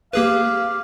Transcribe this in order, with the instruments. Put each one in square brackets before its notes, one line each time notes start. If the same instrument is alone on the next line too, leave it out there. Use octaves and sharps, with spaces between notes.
[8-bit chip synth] A#3 G#4 B4 [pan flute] G4 [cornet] F5